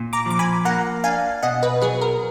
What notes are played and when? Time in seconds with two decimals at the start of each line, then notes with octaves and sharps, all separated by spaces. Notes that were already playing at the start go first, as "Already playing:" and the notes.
Already playing: A#2
0.13 A#5 D6
0.26 F3 D6
0.39 G#5 B5
0.65 A#3 F#5 A#5
1.04 D4 F5 G#5
1.43 B2 D#5 F#5
1.63 B4 D#5
1.82 F#3 G#4 B4
2.01 A#4